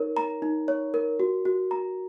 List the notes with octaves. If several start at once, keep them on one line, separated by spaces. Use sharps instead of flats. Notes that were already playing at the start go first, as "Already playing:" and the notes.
Already playing: D#4 A#4 C#5
A#5
D#4
C#5
A#4
F#4
F#4
A#5